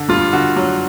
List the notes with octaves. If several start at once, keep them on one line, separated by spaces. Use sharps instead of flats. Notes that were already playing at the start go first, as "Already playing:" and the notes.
Already playing: D3
G2 F4
D3 F#4
F#3